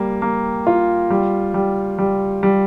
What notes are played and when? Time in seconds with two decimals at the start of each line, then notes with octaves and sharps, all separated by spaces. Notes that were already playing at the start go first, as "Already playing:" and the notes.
Already playing: G3 A#3
0.22 A#3
0.67 F4
1.10 G3
1.54 G3
1.98 G3
2.43 G3